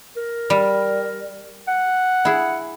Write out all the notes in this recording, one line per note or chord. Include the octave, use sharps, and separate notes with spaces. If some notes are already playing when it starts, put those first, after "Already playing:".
A#4
G3
F#5
E4 G#4